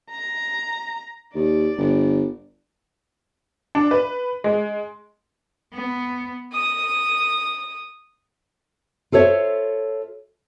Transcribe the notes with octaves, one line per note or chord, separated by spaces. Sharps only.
A#5
D#2 D5
G1
D4
B4
G#3
B3
D#6
F4 A4 C5 C#5 E5